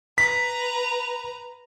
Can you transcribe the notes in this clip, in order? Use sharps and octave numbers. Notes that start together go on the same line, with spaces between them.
B4 A#5 B6